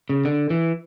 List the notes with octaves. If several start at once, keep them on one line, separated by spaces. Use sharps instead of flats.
C#3
D3
E3